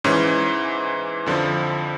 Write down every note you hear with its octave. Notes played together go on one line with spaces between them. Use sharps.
G#2 E3 C#4
F2 D3 F3